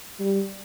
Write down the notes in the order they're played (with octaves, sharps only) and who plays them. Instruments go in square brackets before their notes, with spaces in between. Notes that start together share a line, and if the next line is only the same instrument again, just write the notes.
[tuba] G3